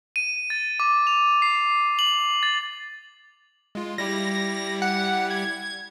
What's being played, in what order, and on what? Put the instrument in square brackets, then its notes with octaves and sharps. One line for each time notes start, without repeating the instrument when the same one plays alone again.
[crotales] D#7
A6
D6
F7
C7
F#7
A6
[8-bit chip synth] G#3 F4
[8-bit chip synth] G3 E4 G4 [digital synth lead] A#6
[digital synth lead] F#5
G#6